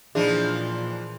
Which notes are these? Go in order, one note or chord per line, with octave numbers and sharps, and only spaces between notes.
A#2 E3 F3 D4 D#4 G#4